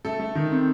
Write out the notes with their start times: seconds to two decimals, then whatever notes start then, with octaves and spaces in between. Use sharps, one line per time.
0.05 A3 A4
0.20 A3
0.35 D#3
0.51 C4